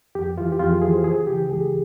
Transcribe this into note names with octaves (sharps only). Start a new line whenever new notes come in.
F2 G4
E3 F4
G4
F2 F4
G#4
E3 G#4
C5
C#2 G#4
C#3 E3 G4
C#2 G#4